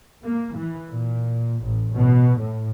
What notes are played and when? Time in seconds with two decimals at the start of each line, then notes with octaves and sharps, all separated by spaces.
0.25 A#3
0.56 E3
0.91 A#2
1.64 A1
1.95 B2
2.41 A2